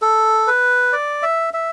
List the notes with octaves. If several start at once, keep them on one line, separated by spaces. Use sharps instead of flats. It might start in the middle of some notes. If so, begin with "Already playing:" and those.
A4
B4
D5
E5
E5